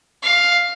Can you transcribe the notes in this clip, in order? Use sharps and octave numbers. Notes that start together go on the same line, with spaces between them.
F5